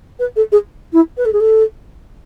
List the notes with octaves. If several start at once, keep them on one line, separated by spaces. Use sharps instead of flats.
B4
A4
G#4
E4
B4
A4
G#4
A4